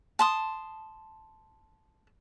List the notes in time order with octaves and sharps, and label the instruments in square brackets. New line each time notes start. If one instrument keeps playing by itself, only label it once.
[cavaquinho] A5 C6 D#6